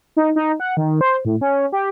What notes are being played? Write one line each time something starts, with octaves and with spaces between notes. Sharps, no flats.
D#4
D#4
F#5
D#3
C5
A2
C#4
G4